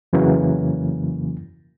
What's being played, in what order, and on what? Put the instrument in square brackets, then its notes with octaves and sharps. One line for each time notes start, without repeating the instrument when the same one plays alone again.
[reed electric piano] F2 C#3 E3 F#3 A#3